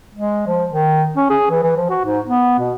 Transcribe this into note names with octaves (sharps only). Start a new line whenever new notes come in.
G#3
F3
D#3
C#4
G#4
E3
E3
F3
F#4
G#2
B3
B2